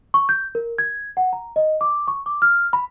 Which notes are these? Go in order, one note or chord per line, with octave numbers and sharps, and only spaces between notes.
C#6
G6
A#4
G#6
F#5
A#5
D#5
D6
C#6
D6
F6
B5